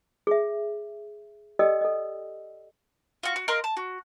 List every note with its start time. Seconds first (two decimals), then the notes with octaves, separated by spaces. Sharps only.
0.27 G#4 E5
1.59 G4 A4 D5 D#5 G5 E6
1.81 A4 D#5
3.23 F4 F#4
3.36 F#4
3.48 A#4 D#5 F5 C6
3.64 A5
3.77 F#4